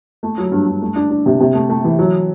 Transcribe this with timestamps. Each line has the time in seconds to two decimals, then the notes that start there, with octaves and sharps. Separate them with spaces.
0.23 A3
0.38 F#3
0.52 G2
0.67 G2
0.82 A3
0.96 D4
1.10 D4
1.26 C3
1.40 C3
1.54 A3
1.69 A3
1.84 E3
1.99 F#3